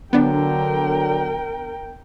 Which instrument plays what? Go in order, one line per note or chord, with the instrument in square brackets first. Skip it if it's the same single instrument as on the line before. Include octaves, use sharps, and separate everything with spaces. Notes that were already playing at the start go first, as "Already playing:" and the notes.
[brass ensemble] D3 F#3 [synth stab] B3 D4 [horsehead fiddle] A#4 G5